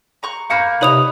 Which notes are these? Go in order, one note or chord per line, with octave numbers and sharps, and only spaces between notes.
A#5 C#6 F#6
A#3 F5 A#5 B5 C#6 G6
C3 D#4 B4 C#5 B5 D#6 F7